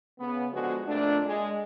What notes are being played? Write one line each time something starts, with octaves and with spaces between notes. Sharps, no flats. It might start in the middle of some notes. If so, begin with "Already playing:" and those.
C#3 B3
D3 F3 G#3 B3 F#4
F2 A#2 A3 D4
G#3